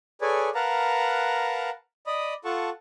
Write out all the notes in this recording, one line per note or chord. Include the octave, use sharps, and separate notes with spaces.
G#4 A4 B4 C#5 D5 G#5
A#4 B4 F5 F#5 A5 A#5
D5 D#5 B5 D#6
F4 A4 F#5 A5 C#6